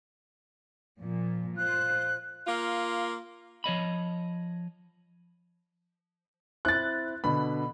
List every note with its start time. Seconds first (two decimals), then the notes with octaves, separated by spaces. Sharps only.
1.00 A#2 F3
1.57 F4 C5 F#6
2.47 A#3 F4
3.64 F3 C#5 D#5 B5
6.65 C4 E4 F#6 A6
7.24 B2 D3 B5